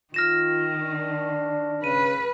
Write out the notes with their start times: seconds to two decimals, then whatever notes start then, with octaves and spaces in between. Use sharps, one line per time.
0.14 D#3 F4 F6 A#6 E7
0.79 D4
1.84 C#3 B4 D#7